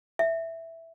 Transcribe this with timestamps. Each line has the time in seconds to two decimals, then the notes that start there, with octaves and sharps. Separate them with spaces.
0.19 E5